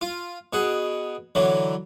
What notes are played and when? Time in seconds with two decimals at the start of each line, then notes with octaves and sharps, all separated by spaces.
0.01 F4
0.53 B2 G#4 F#5
1.35 D3 E3 F#3